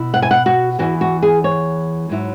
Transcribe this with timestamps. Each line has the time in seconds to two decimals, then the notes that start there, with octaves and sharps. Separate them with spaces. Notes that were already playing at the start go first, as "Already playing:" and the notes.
Already playing: B2 E4
0.14 F#5
0.22 G#5
0.31 F#5
0.46 F#4
0.79 E2 C#3 E3 F#4
1.01 F#4
1.22 G#4
1.44 C#5
2.09 G#2 F#3 E4